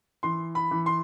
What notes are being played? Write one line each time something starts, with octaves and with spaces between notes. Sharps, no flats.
E3 C6
B5
E3
C6